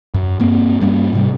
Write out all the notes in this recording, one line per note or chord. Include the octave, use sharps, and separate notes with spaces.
F#2
G2 A#3 C4
G2 G3 A#3 C#4
G#2 C3 G3